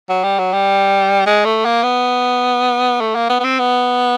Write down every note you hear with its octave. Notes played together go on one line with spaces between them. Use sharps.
F#3
G3
F#3
G3
G#3
A3
A#3
B3
A3
A#3
B3
B3
C4
B3